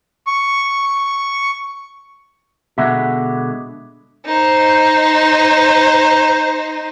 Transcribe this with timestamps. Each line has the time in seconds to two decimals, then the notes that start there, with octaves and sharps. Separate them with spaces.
0.27 C#6
2.78 B2 D3 G#3 E5 F#5 B6
4.26 D#4 C5